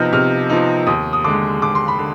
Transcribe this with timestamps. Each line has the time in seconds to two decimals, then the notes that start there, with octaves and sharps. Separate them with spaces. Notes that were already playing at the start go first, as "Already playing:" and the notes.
Already playing: C3 F3 B3 D#4 F6 G6
0.13 C3 F6
0.49 F3 B3 D#4
0.87 D#2 D#6
1.13 D#6
1.24 D3 G#3 D6
1.62 D#2 D6
1.75 C6
1.88 B5
1.99 D3